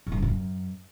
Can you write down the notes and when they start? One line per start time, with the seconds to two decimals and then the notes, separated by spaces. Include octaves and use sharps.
0.07 G2
0.12 G#2
0.17 C#3
0.22 F2
0.28 F#2